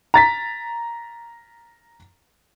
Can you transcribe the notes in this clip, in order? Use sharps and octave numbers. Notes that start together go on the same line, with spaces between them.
A#5 A6 B6